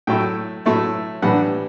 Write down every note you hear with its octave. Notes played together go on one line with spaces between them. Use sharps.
A2 F#3 A3 E4 G5
A2 F#3 A3 E4
A2 E3 G3 D4 F#5